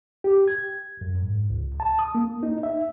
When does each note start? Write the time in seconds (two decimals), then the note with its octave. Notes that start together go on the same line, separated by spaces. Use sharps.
0.24 G4
0.48 G#6
1.01 F#2
1.22 G#2
1.50 C#2
1.80 A5
1.99 D#6
2.15 A#3
2.43 D#4
2.63 E5